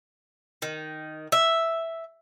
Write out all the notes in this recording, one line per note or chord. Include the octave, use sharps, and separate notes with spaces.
D#3
E5